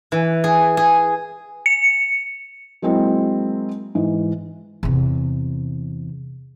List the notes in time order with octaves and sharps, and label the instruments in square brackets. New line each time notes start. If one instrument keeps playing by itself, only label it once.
[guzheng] E3
G#4
G#4
[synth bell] C#7
[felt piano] F#3 G#3 A#3 C4 E4
G#2 E3
[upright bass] E2 C3